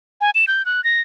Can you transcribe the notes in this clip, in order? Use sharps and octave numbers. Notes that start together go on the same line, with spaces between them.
G#5
E7
G6
F#6
A#6